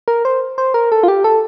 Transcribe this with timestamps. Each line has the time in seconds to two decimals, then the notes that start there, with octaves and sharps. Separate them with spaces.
0.08 A#4
0.25 C5
0.58 C5
0.74 A#4
0.92 A4
1.03 F4
1.08 G4
1.24 A4